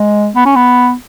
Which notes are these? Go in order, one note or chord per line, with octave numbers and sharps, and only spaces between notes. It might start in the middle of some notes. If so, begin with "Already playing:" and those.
Already playing: G#3
B3
C#4
B3